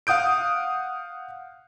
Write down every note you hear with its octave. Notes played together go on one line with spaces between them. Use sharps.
F5 F#5 D#6 G6 D7